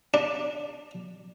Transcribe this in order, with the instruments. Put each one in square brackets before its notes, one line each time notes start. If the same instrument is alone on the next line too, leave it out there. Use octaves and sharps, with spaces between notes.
[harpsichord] D4